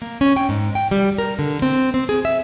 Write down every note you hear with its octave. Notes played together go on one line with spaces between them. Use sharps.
A#3
C#4
G5
G#2
G5
G3
A#4
D3
C4
C4
G#4
E5